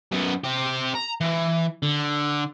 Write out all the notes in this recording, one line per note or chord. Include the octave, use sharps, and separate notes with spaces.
F#2 B3
C4 G4
A#5
E3
D3